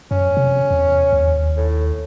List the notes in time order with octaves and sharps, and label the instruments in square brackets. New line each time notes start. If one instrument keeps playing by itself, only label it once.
[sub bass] F#2 [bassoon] C#4
[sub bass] C3
E2
D#2
[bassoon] A2